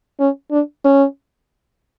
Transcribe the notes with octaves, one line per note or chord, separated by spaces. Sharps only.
C#4
D4
C#4